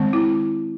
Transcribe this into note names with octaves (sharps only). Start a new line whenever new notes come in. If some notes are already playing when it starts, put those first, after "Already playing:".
Already playing: D#3 G#3 C4
E4